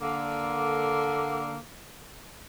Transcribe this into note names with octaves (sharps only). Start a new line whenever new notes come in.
D3 A#3